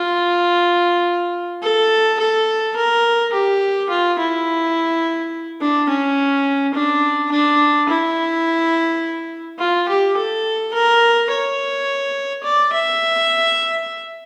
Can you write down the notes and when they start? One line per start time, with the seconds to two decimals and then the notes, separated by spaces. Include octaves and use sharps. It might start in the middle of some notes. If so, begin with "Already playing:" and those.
Already playing: F4
1.62 A4
2.19 A4
2.76 A#4
3.33 G4
3.90 F4
4.18 E4
5.61 D4
5.89 C#4
6.74 D4
7.32 D4
7.89 E4
9.59 F4
9.89 G4
10.17 A4
10.74 A#4
11.30 C#5
12.44 D5
12.73 E5